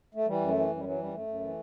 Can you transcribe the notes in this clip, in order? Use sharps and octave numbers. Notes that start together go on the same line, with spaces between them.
A3
E3 G3
F#2
A3
E3
F#2
G3
E3 F#3
F#2 G3
F#2 A3
F#2
E3